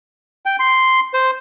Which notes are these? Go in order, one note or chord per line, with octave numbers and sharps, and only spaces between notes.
G5
C6
C5